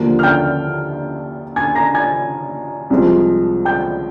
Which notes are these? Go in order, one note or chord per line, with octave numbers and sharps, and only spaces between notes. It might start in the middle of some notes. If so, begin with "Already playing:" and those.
Already playing: D#2 D3 F3 A#3
F6
G5 G6
G#5 G#6
A#5 A#6
G#5 G#6
C2 C3 F3 G#3
G5 G6